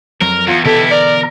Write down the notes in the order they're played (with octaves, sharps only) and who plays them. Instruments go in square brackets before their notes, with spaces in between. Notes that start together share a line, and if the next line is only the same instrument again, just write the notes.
[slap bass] F2 F#3 [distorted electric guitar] A#4
[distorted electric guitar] E2 [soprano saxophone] F4
[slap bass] B2 D3 E3 [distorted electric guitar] E4 G4 [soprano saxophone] A4
[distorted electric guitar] A#4 [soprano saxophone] D5